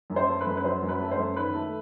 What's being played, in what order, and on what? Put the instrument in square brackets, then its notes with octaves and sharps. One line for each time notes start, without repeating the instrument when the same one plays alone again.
[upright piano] F#2
C5
A3
B4
F#2
B4
F#3 C5
F#2
B4
A3
C5
F#2
D#3 B4
A3